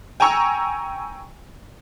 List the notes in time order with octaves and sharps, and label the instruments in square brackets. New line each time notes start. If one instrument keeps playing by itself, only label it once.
[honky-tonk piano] G5 G#5 A#5 C#6 E6